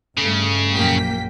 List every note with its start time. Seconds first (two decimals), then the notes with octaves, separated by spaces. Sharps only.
0.18 G2 C#3 A3
0.72 A#1 F#2 A#3 G5 B6